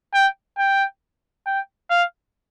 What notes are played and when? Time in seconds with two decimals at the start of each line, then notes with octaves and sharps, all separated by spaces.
0.14 G5
0.58 G5
1.46 G5
1.90 F5